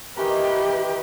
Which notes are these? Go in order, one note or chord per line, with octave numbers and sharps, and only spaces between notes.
D#3 E3 G4 A#4 B4